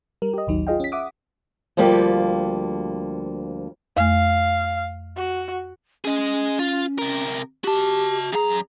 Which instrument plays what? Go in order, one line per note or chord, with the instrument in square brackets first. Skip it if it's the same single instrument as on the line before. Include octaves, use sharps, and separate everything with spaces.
[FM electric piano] G3 A#4
G4 D#5
A1 D#2 F#3 D#4
F4 G#4 D#5 F5 G5
C#4 B6
E5 F#5 D6 D#6
[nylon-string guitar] D2 F3 G3 A#3 G4
[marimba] F2 A3 [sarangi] F5
[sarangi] F#4
[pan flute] C#4 [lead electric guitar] G#4 D#5
[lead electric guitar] F4
C3 A#4
[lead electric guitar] F#4 A5 [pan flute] G4
[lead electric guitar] F#2 A#5 [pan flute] G#4